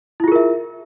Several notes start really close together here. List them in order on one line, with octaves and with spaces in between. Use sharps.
E4 F4 G#4 A#4 E5